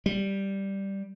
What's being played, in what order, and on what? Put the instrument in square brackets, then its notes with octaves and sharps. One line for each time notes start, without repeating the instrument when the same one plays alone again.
[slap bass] G3